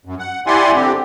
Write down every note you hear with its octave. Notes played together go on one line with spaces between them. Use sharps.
F#2
F#5
E4 G4 D5 F#5 G#5 C6
D3 C4 G4